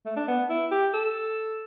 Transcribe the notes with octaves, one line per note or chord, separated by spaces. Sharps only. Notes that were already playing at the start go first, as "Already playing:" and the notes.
A3
D4
B3
E4
G4
A4